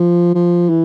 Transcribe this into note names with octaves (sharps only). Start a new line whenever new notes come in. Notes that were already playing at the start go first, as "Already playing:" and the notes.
Already playing: F3
F3
E3